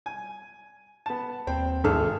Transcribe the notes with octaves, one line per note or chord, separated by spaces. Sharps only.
G#5
B3 A5
D#2 C4 G5
G#1 G#4 A4 F6